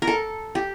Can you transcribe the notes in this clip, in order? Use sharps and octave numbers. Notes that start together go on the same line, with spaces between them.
A#4
A4
G4